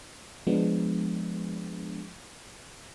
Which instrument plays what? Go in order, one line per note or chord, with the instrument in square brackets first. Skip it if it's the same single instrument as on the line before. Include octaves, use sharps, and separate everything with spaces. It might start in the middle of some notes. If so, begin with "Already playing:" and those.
[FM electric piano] F3 G#3 B3 D4